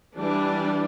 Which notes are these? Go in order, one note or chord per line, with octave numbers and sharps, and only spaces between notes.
E3 G3 D4